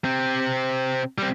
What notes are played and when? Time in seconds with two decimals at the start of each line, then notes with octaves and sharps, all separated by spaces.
0.04 C3 C4
1.18 G3 C4